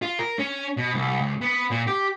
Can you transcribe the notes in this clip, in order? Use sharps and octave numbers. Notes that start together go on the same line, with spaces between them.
F4
A#4
C#4
B2
C2
C#2
B3
A#2
G4